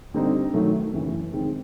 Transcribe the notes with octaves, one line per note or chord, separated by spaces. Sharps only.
D3 G3 C4 D#4
D#3 F#3 A3
F#2 C#3 E3
D#3 G#3 C4 D#4